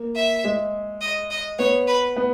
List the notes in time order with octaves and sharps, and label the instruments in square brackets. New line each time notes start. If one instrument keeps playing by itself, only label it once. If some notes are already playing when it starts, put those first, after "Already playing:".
Already playing: [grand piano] A#3
[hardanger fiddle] E5
[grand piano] G#3
[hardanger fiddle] D#5
D#5
[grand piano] B3 [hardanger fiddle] C#5
[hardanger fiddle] B4
[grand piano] B3